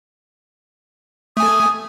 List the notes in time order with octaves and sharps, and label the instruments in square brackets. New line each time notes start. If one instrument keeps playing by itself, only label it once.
[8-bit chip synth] A3 G#5 [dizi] D#6